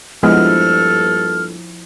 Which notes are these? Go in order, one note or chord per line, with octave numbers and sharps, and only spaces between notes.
A#1 G2 F3 G#3 B3 E4 A4 F6